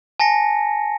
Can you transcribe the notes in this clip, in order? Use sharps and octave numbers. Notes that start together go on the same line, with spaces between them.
G#5 A5 A#6 C#7